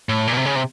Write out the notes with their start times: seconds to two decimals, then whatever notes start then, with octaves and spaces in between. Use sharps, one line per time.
0.09 A2
0.27 A#2
0.33 B2
0.37 C3
0.46 C#3
0.55 C3